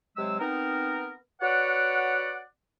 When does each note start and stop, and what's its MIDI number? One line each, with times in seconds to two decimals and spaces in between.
0.16 0.39 48
0.16 0.39 54
0.16 0.39 56
0.16 0.39 88
0.40 1.11 59
0.40 1.11 60
0.40 1.11 63
0.40 1.11 70
1.41 2.41 66
1.41 2.41 71
1.41 2.41 73
1.41 2.41 74
1.41 2.41 78